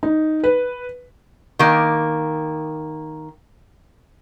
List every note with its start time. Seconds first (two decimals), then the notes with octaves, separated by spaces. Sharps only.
0.03 D#4
0.44 B4
1.59 D#3 A#3